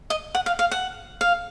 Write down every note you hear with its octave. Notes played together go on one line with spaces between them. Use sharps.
D#5
F#5
F5
F5
F#5
F5